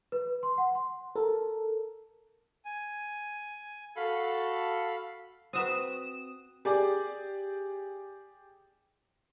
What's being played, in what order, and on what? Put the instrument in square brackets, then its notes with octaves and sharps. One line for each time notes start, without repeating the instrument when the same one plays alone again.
[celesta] B4
C6
F#5
C6
[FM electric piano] A4 A#4
[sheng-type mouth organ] G#5
[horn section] F#4 A4 [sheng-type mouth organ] F5 B5
[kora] C4 F#4 B4 [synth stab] D#6 E7
[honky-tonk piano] G4 G#4 D5